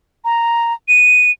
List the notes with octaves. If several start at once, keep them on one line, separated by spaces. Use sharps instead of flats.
A#5
D#7